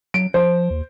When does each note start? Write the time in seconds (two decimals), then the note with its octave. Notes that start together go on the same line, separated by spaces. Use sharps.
0.14 F#3 D7
0.34 F3 C5
0.70 D#2